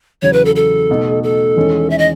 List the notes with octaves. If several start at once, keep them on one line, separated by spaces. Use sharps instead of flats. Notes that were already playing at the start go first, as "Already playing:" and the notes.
E2 C#3 F#3 C#5
B4
A4
A4
B2 A3 D#4
A4
E2 D#3 G#3 C#4
E5
D#5